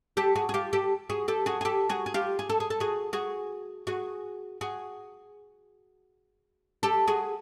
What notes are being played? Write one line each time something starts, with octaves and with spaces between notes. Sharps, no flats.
G4 A4
F#4 G#4
G#4
F4 G4
G4 A4
F#4 G#4
G4 A4
F#4 G#4
G#4
G4 A4
F#4 G#4
G#4
F4 G4
G#4
A4
G#4
A4
F#4 G#4
F#4 G#4
F#4 G#4
F#4 G#4
G4 A4
F#4 G#4